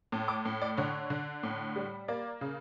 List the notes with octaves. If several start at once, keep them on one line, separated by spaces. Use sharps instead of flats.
A2
D6
A2
D5
D3 C#5
D3
A2
G3
A#3 D5
C#3